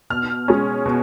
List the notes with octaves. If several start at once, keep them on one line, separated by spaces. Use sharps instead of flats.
B2 F6
G#3 C#4
B2